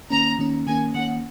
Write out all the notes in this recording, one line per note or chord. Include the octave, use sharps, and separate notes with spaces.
D#3 A#3 C#4 A#5
D#3 A#3 C#4
D#3 A#3 C#4 G#5
D#3 A#3 C#4 F#5